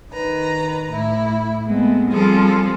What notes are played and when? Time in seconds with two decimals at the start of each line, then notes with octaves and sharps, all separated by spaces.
0.12 D#3 B4 A#5
0.93 A2 E4
1.66 G#3 A3 B3 C4
2.10 F3 G3 C4 F4 G#4 A4